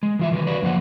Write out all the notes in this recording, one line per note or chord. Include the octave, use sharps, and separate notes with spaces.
G#3
E3 F4 E5
D#3 F#3 A#4 B4
F#4 G4 B4 C#5 D5
F#2 D3 F3 A#3 C5 F#5